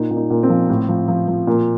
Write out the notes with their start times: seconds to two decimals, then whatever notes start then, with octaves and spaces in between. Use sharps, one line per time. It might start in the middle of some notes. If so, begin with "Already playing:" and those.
Already playing: A#2 D#4
0.10 A#2
0.17 D#4
0.30 A#2
0.43 C4
0.50 F3
0.70 A2
0.89 F3
1.08 F3
1.28 F3
1.47 A#2